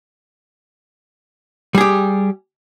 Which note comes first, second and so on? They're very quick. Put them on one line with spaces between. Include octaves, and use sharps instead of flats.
G3 G#4 G4